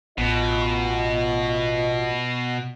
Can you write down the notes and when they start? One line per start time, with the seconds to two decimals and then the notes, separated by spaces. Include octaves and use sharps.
0.18 A1 B2 F4 D#5